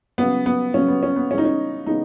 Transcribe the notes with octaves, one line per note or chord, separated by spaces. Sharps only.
C#3 F#3 B3
B3
C#3 F#3 B3 C#4
B3
C#4
B3
C#3 E3 G#3 B3 C#4
D#4
C#4
C#3 E3 G#3 B3 D#4